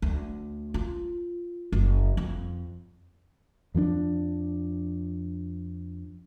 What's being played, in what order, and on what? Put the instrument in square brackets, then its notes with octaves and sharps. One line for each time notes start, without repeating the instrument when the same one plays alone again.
[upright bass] D2
F4
F#1
F2
[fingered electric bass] F2 F3 A3 D4